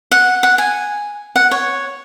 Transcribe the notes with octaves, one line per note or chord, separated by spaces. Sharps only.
F#5
F#5
G#5
F#5
C#5